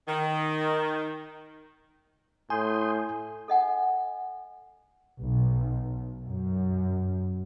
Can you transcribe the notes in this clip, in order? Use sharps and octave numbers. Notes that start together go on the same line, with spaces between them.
D#3
A2 G#5 C6 D#6 G6
A4 D#5 F#5 G#5
B1
F#2